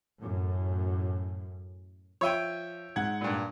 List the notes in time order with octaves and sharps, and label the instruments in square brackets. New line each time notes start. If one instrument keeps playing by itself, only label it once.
[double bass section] F#2 A2
[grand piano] F3 D#7 [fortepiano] C#5 E5 G5
[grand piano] G#2 F#5 G#6
[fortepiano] G2 A#2